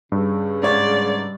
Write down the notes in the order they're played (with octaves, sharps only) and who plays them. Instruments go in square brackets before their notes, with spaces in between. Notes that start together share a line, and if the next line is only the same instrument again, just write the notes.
[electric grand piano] G2 [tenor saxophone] C#3
[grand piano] G#2 C#5 [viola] D5